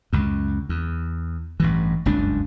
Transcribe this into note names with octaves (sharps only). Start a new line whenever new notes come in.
C#2 F#2
E2
A1 G2 E3
F#1 C#2 G2 D4